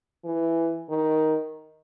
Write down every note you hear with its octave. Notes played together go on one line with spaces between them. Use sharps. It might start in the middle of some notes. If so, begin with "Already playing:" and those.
E3
D#3